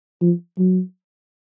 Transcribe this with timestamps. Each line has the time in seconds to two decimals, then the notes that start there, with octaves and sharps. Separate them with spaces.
0.21 F3
0.58 F#3